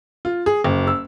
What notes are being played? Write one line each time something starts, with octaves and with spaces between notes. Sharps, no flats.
F4
G#4
F#1
E6